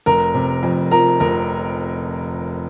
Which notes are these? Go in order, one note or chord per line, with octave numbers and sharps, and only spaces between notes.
F1 A#4 A#5
C3
F2
F3 A#4 A#5
F1 A#4 A#5